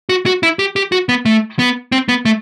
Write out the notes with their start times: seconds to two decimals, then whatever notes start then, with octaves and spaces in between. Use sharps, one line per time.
0.09 F#4
0.26 F#4
0.43 E4
0.59 G4
0.76 G4
0.92 F#4
1.09 B3
1.26 A3
1.59 B3
1.92 C4
2.09 B3
2.25 A3